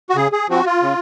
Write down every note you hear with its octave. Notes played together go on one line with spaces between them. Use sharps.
F#4
C#3 G#4
G#4
F3 C4 F#4
F4
C#3